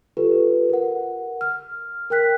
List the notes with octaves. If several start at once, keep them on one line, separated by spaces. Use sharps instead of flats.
F4 G4 A4 B4
A#4 F#5
F6
A#4 G5 F#6 B6